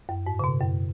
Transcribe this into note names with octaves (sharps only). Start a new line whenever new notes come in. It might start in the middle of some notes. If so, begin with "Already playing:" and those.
F#2
G#2
C#3
B2
F#2